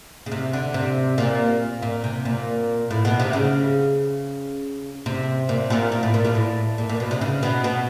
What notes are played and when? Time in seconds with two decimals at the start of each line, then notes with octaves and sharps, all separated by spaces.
0.26 C#3
0.32 C3
0.53 D3
0.74 C3
1.18 A#2
1.83 A#2
2.04 C3
2.25 A#2
2.91 A2
3.05 B2
3.20 C3
3.33 C#3
5.06 C3
5.49 A#2
5.70 A#2
5.92 A#2
6.03 A2
6.14 A#2
6.25 A#2
6.35 A2
6.78 A#2
6.89 A#2
7.00 B2
7.11 C3
7.21 C#3
7.43 B2
7.64 B2